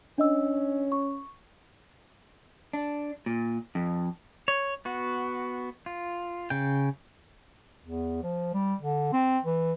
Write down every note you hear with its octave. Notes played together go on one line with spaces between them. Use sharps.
C#4 D4 D#5 E6
C#6
D4
A#2
F2
C#5
B3 F#4
F4
C#3 G5
E2
F3
G3
D3
C4
E3